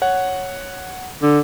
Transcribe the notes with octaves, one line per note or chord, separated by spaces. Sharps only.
C#5 F#5
D3